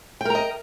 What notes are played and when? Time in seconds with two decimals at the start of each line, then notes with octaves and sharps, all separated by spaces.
0.21 G5
0.25 A#4
0.30 A#5
0.35 D#5